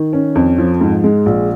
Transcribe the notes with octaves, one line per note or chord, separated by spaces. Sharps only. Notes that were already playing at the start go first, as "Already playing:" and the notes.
Already playing: D#3
C#4
F2
F3
G#2
G#3
A#1